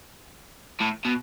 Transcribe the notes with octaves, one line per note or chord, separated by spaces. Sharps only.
A2
B2